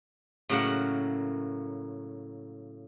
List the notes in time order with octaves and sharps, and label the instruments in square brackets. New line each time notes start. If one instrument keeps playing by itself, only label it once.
[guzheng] A2 C#3 F#3 A#3 A#4 F#5